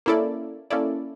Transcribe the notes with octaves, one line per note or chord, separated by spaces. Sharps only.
A#3 C#4 E4 A4 D5
A#3 C#4 E4 A4 D5